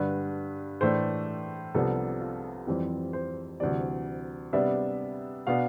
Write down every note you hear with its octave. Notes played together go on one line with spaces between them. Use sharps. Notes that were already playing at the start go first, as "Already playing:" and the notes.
Already playing: G2 D3 G3 D4 B4
A2 E3 A3 D4 C5
C2 C3 F3 B3 D4 A4
F4
F2 E3 G3 C4
C5
D2 C3 E3 G3 D5
C3 G3 B3 D4 E5
B2 B3 D4 F5